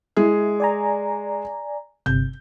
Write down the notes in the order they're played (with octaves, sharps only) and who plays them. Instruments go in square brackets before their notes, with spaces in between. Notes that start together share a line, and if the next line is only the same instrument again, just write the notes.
[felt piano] G#3 G#4 [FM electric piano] E4
[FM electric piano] D5 G#5 A#5
[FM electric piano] G1 C3 [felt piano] G6